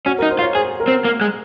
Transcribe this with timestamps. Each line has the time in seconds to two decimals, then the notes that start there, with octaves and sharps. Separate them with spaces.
0.06 C#4 F#4
0.19 A#4
0.22 D#4
0.31 C5
0.39 F4
0.42 C#5
0.55 G#4 C5
0.80 A#4
0.88 C4
1.05 A#3
1.21 G#3